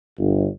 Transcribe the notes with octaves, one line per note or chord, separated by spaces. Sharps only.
G1